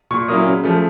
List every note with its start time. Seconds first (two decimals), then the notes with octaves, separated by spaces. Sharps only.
0.11 A#2 C#6
0.28 F#3 A#3 C#4 E4 D#6
0.46 C#3
0.64 F3 A3